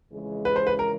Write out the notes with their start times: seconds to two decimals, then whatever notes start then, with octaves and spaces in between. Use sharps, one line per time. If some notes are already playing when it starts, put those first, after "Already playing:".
0.11 F2 C#3 E3 G#3
0.45 B4
0.56 C5
0.67 B4
0.79 A#4